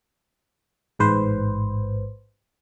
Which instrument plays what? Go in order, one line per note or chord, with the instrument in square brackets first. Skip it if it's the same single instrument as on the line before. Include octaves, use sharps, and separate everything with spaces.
[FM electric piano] A1 G#2 B4 C5